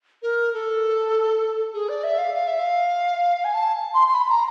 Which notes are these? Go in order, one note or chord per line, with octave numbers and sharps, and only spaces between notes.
A#4
A4
G#4
D5
E5
F5
F5
E5
F5
G#5
A5
C6
C6
B5
B5
A#5